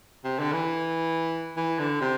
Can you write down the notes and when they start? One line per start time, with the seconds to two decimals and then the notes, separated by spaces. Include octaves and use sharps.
0.24 C3
0.39 D3
0.53 E3
1.57 E3
1.79 D3
2.01 C3